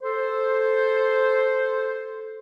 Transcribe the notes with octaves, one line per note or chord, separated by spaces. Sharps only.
A4 C5